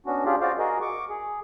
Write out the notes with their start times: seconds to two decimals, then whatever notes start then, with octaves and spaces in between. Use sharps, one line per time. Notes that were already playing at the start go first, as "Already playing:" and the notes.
0.06 B3 C#4 D4 F#4
0.25 C#4 D4 F4 G4 G#4
0.41 F4 F#4 C5 D5 F5
0.58 F#4 G#4 A#4 D#5
0.81 C#6 D6
1.10 G#4